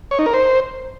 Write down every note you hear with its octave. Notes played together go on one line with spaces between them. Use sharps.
C#5
D#4
A#4
C5